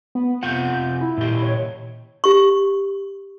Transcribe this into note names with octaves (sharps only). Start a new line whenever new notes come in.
B3
C3 F4 F#5 G6
E4
A#2 G4
C#5
G4 C#6